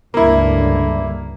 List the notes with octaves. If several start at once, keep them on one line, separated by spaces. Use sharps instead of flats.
C#2 G2 D3 A#3 E4